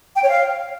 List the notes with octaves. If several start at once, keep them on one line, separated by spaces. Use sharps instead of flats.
G5
C#5
F5